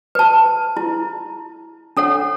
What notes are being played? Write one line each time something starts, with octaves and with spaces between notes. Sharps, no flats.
B4 A5
E4
D4 A4 C#5 F#5